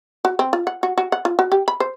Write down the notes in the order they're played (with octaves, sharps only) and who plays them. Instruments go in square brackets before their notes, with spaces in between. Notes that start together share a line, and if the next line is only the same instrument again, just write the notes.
[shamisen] F#4
C4
F4
F#5
F#4
F#4
F#5
F4
F#4
G4
B5
C5